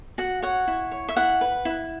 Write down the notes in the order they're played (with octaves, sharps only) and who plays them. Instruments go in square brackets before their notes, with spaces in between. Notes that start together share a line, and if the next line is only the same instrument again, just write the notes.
[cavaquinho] F#4 F#5
C#5 F#5
E4
C#5
E5
E4 F#5
B4
E4